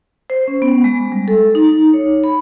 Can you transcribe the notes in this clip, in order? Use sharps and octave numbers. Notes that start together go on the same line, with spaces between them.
C5
C#4
B3
G#3
G3
A4
D#4
C#5
B5